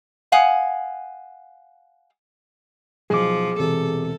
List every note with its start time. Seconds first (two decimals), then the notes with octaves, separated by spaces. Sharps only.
0.32 F5 F#5 G#5 D#6
3.10 B1 F3 G#4 D6
3.59 E1 E2 C3 A4